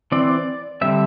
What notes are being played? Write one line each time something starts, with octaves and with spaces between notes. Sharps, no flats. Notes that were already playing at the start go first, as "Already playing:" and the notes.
E3 C4 D5
D3 G3 C4 E5